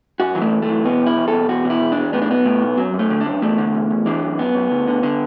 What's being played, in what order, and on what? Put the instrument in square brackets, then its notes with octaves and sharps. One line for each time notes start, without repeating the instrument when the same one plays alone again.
[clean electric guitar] F#2 F#4
E3 F#3
A3
F#2
A3
E3
B2 B3
E2
E4
E2
A4
B2
E2 F#4
B2
E4
E2
E2 D4
A2 B3
D4
B1 B3
A2
B1
F#2 F#3
F#2
A3
D3
D4
F#2
E2 A3
D3
E2
E2
E3 D4
F#2
F#2 B3
F#2
D2
D3
D3